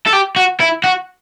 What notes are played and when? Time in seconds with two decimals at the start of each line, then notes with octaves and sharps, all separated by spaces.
0.07 A4
0.13 G4
0.36 F#4
0.60 E4
0.84 F#4